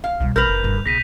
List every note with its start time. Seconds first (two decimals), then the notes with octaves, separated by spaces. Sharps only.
0.04 F5
0.20 C2 B2 G3
0.36 A1 A#4 B4 G6 F7
0.49 F#1 F#2
0.63 F#1 G2 D3
0.86 B1 C#3 A#6 B6 D#7